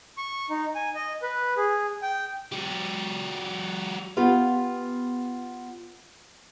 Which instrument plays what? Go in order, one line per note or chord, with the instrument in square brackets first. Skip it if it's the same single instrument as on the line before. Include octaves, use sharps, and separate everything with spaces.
[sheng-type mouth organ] C#6
D#4
G#5
D#5
B4
G#4
G5
[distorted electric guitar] F#3 G4
[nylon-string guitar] B3 F4 G4 B4 F5